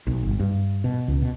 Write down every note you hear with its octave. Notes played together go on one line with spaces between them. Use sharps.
B1
G1
G2
B2
C#2
B2